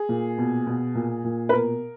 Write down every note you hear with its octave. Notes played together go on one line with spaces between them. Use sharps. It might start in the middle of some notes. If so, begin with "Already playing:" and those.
Already playing: G#4
A#2
B2
B2
A#2
A#2
B4
B2 A#4